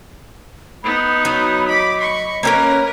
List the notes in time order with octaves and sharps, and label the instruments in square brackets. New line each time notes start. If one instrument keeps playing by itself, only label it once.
[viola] B3 D#4 [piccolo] B5
[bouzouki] F#3
[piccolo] D#5 [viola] B5 D6
[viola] B5 C#6
[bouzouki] A#3 C4 C#4 [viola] A#4 B4